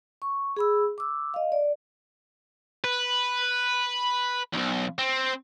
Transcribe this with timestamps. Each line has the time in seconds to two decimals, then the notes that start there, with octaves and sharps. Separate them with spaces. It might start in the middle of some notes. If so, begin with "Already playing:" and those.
0.22 C#6
0.57 G#4 B5 E6
0.98 D6 E6
1.34 D#5 F5
1.52 D5
2.84 B4
4.53 B1 E2
4.99 C4